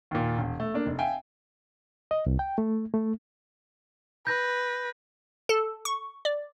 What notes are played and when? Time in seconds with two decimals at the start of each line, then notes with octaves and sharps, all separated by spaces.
0.11 D#2 A#2
0.38 E1
0.60 A3
0.74 A#3 D4
0.86 F1
0.98 E5 F5 G5 G#5
2.11 D#5
2.26 C2
2.39 G5
2.58 A3
2.94 A3
4.27 B4 G6 A#6
5.49 A4
5.85 C#6
6.25 D5